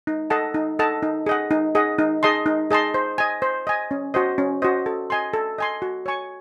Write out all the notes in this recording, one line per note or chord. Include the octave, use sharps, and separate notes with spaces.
D#4
A4 D#5 F#5 A5
D#4
A4 D#5 F#5 A5
D#4
G#4 D#5 F#5
D#4
G#4 D#5 F#5
D#4
G#4 D#5 A5 C6
D#4
G#4 D#5 A5 C6
C5
D#5 G#5
C5
D#5 G#5
C#4
F#4 C5 D#5
C#4
F#4 C5 D#5
A4
D#5 G#5 C6
A4
D#5 G#5 C6
F#4
C#5 G#5 C#6